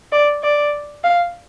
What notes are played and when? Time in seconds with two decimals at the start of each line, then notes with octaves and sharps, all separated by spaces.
0.12 D5
0.43 D5
1.04 F5